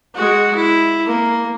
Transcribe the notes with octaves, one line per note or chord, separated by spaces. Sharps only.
G#3 F#4
E4
A#3